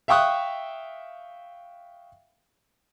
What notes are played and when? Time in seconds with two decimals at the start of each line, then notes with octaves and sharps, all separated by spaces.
0.08 E5 F5 G5 C#6 D#6 F#6